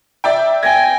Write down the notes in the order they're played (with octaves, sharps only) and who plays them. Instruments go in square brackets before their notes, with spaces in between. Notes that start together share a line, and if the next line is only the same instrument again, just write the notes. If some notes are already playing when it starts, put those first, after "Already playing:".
[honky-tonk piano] D5 E5 G5
[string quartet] G5 G#5 [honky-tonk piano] G#6 A#6